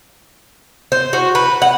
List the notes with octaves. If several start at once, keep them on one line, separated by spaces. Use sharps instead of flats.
C5
F#4
B4
F#5